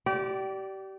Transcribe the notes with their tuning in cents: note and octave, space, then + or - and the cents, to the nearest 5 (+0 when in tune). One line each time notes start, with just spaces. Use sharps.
G4 -30 D5 -5